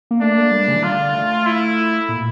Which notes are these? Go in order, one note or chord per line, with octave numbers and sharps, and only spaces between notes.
A#3
A3 D4
A#3
G3
C#3
E3
D3 F4
A3
E4
A#2